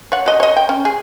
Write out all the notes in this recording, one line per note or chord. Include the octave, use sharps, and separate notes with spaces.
C#5 F#5
F#4 D#5
C#5 D#5
G5
C#4
G#4